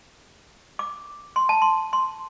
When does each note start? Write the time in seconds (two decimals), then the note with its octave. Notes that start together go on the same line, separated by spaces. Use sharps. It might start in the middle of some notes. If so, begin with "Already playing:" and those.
0.79 D6
1.36 C6
1.49 A5
1.62 C6
1.93 C6